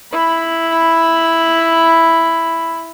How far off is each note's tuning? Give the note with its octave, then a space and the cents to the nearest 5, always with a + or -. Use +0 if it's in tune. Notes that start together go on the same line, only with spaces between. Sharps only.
E4 +0 B5 +0